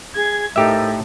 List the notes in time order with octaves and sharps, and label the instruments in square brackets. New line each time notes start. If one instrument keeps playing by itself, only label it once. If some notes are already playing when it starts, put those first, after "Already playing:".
[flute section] G#4 [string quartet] G#6
[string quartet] A2 [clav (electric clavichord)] D#4 G4 E5 [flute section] A4 A#4 C5